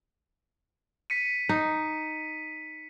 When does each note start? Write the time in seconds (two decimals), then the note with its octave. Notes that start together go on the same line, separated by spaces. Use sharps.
1.10 B6 C#7 D#7
1.49 D#4